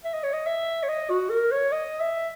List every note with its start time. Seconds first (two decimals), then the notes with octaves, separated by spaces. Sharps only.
0.05 E5
0.14 D#5
0.24 C#5
0.33 D#5
0.47 E5
0.83 C#5
0.89 D#5
1.10 F#4
1.30 A#4
1.51 C#5
1.72 D#5
2.01 E5